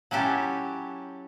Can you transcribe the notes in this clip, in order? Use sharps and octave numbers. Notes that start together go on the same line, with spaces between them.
F#3 C#4 E4 G4 A4